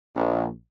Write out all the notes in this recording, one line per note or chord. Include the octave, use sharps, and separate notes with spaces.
A#1